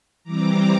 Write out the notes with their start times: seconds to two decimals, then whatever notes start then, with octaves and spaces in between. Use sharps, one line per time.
0.24 E3 G3 C4 A#5 D6